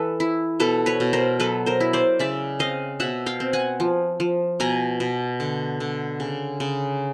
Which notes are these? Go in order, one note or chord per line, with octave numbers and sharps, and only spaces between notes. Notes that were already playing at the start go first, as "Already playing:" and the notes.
Already playing: E3 A4 B4
E4
B2 A4 B4
B4 C#5
B2
A#4 C5
F#3 A4 B4
A#4 C5
E4
C5 D5
C#3 D5 E5
C4 D#5 F5
B2 E5 F#5
F5 G5
C4
F#5 G#5
F3
F3
B2 G#5 A#5
B2
D3
D3
C#3
C#3